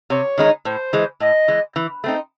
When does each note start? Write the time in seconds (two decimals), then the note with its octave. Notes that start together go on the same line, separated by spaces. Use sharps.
0.10 C3 C#5
0.38 D#3 G#3 D#4
0.65 A2 C5
0.93 E3 G#3
1.20 A2 D#5
1.48 E3 G#3
1.76 E3
2.04 A3 C4 D#4